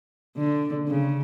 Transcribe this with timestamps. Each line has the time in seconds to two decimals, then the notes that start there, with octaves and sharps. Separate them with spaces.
0.37 D3
0.88 C#3